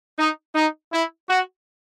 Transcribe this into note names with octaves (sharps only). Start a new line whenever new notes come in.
D#4
D#4
E4
F#4